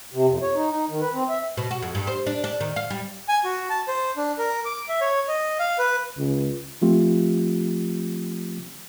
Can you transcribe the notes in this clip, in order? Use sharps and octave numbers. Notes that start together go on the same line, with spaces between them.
C3
F2
C#5
D#4
D#4
D#3
B4
C4
E5
B2
F#4
F2
G2
C5
D4
D4
D#3
F5
G3
G#5
F#4
A5
C5
D4
A#4
D6
E5
C#5
D#5
F5
B4
C#2
F3 A3 C4 F4 G4